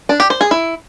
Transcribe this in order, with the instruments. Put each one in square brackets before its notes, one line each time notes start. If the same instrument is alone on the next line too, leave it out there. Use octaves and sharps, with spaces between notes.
[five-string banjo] D4
G4
C5
G#4
E4